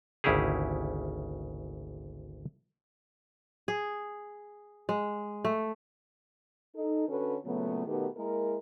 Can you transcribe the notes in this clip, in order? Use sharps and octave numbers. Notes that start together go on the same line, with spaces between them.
G#1 D2 C#3 E4 G4 G#4
G#4
G#3
A3
D#4 A4
D3 C#4 F#4 A4 B4 C#5
A#2 C#3 F#3 A3 B3
B2 D#3 A3 B3 G4 A#4
G#3 A#3 E4 G#4 A#4